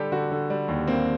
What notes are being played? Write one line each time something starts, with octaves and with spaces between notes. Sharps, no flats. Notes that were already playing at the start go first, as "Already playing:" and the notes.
Already playing: D3 G3 G4 A4
D3 F#4
D3
G3
D#2
A#3 C4